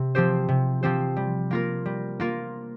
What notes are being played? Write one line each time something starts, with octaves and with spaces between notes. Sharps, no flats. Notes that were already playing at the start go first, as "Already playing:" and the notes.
Already playing: C3
F3 C4 G4 C5
C3
F3 C4 G4 C5
G3
A#3 F4 A#4
G3
A#3 F4 A#4